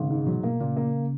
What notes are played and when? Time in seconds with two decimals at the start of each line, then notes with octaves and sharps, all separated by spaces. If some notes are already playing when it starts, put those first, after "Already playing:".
Already playing: G#1 C#3
0.10 G#2
0.27 B2 F#3
0.43 B2 A#3
0.60 A#2 C#3
0.77 A#3